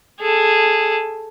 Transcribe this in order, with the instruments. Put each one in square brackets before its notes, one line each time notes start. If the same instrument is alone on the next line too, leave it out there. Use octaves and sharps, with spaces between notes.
[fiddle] G#4 A4